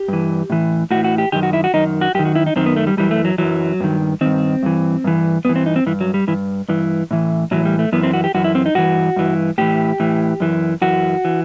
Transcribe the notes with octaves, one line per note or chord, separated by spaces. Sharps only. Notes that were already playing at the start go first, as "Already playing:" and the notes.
Already playing: G4
G2 E3
A2 E3
A2 E3 F#4
F#4
G4
F#2 D#3 G4
F#4
E4
F#4
F#2 D#3 D#4
F#4
F#2 D#3 G4
F#4
E4
D#4
F#2 D#3 C4
B3
A3
G3
F#2 E3 G3
A3
F#3
F#2 E3 F#3
G2 D#3
G2 D#3 C4
G2 E3
G2 E3
G2 E3 B3
C4
D#4
C4
G2 E3
F#3
G3
G2 E3
G2 E3
A2 E3
A2 E3 F#3
G3
A3
F#2 E3 B3
C4
F#4
G4
F#2 E3 F#4
E4
C4
D#4
G2 E3 F#4
G2 E3
A2 E3 G4
A2 E3
F#2 E3
F#2 E3 F#4
E3